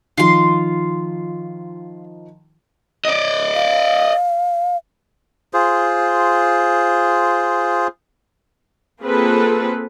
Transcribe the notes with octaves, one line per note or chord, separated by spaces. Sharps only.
D#3 F3 F4 C6
D5 D#5
F5
F4 G#4 C5
A#3 C4 F4 G#4 A4 B4